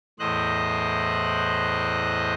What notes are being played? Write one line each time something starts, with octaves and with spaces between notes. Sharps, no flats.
E2 A2 C5 D#5 F#6